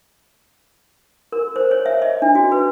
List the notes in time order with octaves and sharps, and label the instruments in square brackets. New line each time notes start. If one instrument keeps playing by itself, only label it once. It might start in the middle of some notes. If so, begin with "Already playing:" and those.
[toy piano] A#4
C5
C#5
E5
D#5
D4
F#4
B4